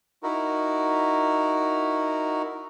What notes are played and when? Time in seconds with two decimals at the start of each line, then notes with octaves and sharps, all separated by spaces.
0.23 D#4 E4 F#4 A#4